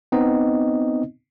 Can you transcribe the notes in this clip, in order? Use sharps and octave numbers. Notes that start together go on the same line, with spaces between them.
B3 C4 D#4 D#5